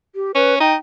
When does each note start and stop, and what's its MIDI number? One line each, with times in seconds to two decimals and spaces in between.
0.15 0.32 67
0.35 0.59 61
0.35 0.55 71
0.60 0.76 63
0.60 0.73 79